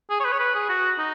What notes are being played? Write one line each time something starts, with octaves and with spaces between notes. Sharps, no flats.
G#4
C#5
B4
C#5
B4
G#4
F#4
D#4